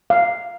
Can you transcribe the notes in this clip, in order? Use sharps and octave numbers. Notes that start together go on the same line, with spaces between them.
F5